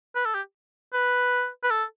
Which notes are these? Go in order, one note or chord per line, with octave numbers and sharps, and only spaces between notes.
B4
A4
G4
B4
B4
A4